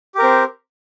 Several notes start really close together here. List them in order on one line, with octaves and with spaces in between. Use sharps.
G4 A#4 C4